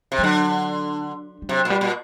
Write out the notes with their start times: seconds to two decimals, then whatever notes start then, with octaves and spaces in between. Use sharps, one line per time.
0.12 C3
0.19 G3
0.23 D3 F#3
1.42 G3
1.49 C3 F#3
1.65 A#2
1.70 G3
1.81 A#2